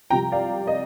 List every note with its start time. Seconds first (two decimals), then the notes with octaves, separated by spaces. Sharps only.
0.10 C2 C3 F3 G5 A#5
0.32 D5 F5
0.67 D#5